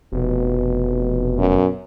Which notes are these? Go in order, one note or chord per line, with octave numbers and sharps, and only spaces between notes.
F1 B2
F#2